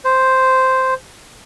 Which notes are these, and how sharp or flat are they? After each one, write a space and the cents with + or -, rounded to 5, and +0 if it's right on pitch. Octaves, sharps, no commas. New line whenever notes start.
C5 -5